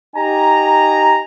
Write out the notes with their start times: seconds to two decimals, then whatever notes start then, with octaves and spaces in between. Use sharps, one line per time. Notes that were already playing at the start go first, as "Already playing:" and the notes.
0.16 D#4 G4 G#5 A#5